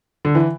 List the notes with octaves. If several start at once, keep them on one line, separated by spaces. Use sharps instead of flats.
D3
E3